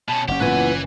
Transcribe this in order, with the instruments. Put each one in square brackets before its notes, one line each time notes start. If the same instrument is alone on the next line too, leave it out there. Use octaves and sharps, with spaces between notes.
[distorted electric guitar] B2 C#4 [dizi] A5
[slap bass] F#1 C#4 [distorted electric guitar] G4 [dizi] F#5
[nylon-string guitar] A#2 E3 B3 [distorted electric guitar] B4 G#5